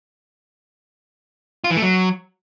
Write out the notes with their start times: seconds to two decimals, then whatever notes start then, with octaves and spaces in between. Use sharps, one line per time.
1.64 F4
1.70 E3
1.76 A3
1.82 F#3